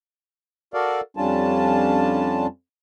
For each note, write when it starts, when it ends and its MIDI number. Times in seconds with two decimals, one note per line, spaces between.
0.74 1.01 66
0.74 1.01 69
0.74 1.01 70
0.74 1.01 74
0.74 1.01 77
1.17 2.47 41
1.17 2.47 55
1.17 2.47 61
1.17 2.47 62
1.17 2.47 65
1.17 2.47 81